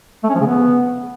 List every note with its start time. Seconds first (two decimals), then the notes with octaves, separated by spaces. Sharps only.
0.24 A3
0.29 C#4
0.35 F3
0.41 C#3
0.47 B3